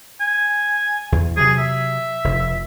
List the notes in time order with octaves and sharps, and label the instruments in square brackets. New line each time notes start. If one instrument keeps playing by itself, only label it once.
[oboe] G#5
[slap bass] E2
[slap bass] C3 F#3 [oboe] G#4
[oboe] E5
[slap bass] F1